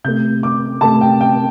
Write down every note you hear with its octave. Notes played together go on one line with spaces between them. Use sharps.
C3 A3 G6
D6
C3 A3 A5
G5
G5